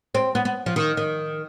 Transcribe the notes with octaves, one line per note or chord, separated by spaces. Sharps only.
C4
B3
B3
F3
D#3
D#3